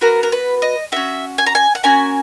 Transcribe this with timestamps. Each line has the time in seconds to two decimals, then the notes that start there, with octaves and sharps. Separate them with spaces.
0.01 B3 F#4 A#4
0.23 A#4
0.32 B4
0.62 D#5
0.92 C#4 F#4 E5
1.38 G#5
1.46 A#5
1.55 G#5
1.75 F#5
1.83 A#3 C#4 F#4 G#5